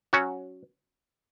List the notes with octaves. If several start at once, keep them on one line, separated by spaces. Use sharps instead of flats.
F#3 C#4 F#4